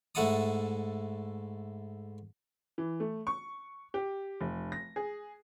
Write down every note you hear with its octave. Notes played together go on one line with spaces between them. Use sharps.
G#2 A3 E4 F#5 A5 D#6
E3
A3
C#6
G4
F1
A#6
G#4